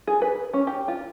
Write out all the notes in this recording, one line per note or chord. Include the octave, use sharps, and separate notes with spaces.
G#4
B4
C#4
G4
F4